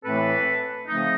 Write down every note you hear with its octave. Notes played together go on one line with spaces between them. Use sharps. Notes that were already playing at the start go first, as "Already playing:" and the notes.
A2 E3 A3 C4 A4 B4
C#3 F3 A3 C4 D#4